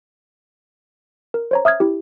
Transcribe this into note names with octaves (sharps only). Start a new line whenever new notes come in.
A#4
C5 C#5 A#5
E5 D#6 F6 G#6
E4 G4